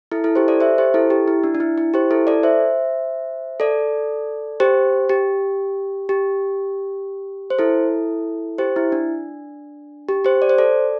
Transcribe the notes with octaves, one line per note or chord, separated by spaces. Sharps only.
E4 A4
E4 A4
G4 C5
A4 D5
C5 E5
G4 C5
E4 A4
G4
E4
D4
D4
E4
E4
G4 C5
E4 A4
A4 D5
C5 E5
A4 D5
G4 C5
G4
G4
C5
E4 A4
G4 C5
E4
D4
G4
G4 C5
D5
C5
A4 D5